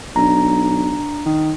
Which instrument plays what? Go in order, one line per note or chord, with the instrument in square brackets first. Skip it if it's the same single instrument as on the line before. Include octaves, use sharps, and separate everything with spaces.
[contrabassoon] B1 [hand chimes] D4 A#5
[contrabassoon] D#3